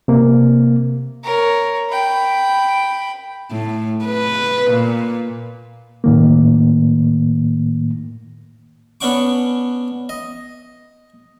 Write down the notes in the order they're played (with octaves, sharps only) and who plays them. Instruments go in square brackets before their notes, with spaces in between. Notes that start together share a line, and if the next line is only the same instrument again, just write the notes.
[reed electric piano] C3 A#3
[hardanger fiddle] A#4 C#5
G5 B5
[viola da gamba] A2
B4
A#2
[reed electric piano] A2 D#3 A#3
[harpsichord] B3 C#4 D4 F#5 C#6 D6
D#5